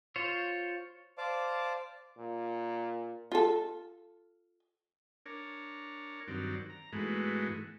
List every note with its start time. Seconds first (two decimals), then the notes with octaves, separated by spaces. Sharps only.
0.16 F4 C5 C#5
1.18 C5 D5 F5 A5 D6
2.18 A#2
3.32 F4 A4
5.26 D4 A#4 C#5
6.28 G2 D#3 F#3 C4 D5
6.70 A#5
6.93 G#2 E3 G#3 A3 B3 F#4